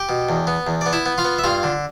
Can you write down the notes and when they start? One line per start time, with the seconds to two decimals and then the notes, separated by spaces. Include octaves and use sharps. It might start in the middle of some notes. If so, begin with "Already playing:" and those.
Already playing: G4 G5
0.09 B2
0.29 E2
0.47 B3
0.67 E2
0.81 B3 D5
0.93 E4 E5
1.06 B3
1.18 F4 F5
1.24 B3
1.39 E5
1.44 G2 F4 F5
1.63 D3